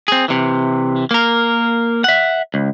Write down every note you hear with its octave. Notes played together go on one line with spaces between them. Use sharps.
C4 G#4
C3 E3
A#3 A#4
E5 F#5
C#2